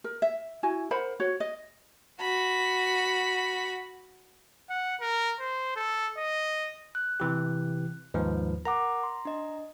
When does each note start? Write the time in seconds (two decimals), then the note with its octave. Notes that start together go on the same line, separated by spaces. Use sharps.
0.04 A#4
0.22 E5
0.63 E4 F#4 G#5
0.91 A#4 C5 F#5 B5
1.20 F#4 C#5 F#5
1.40 D#5
2.20 F#4 B5
4.69 F#5
5.01 A#4
5.39 C5
5.76 A4
6.17 D#5
6.95 F#6
7.20 C3 E3 G4
8.14 D#2 G#2 F3 B4
8.65 A#4 F#5 A#5 D6
9.03 C6
9.25 D4 D#5